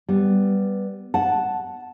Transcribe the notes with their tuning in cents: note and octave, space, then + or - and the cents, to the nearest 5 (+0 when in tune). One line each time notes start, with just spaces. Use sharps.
G3 +0 B3 +0
F#5 +0 A5 -10